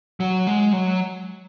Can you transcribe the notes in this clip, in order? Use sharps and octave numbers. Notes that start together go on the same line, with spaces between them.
F#3
G#3
F#3